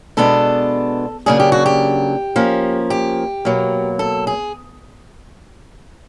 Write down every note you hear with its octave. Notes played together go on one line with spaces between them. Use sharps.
B2 G#3 B3 D4 A4
C#3 F#3 A#3 D4 G#4
G4
F#4
G4
F3 A#3 C#4
G4
B2 F#3 A#3
A4
G#4